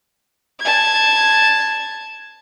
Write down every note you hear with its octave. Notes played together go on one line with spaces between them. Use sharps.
A5 G#6